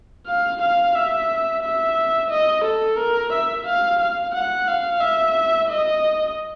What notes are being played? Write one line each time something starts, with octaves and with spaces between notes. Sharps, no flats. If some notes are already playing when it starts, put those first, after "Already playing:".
F5
F5
E5
E5
D#5
A4
A#4
E5
F5
F5
F#5
F5
E5
D#5